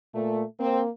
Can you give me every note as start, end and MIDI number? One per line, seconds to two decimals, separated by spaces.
0.15 0.43 46
0.15 0.43 57
0.59 0.90 58
0.59 0.82 60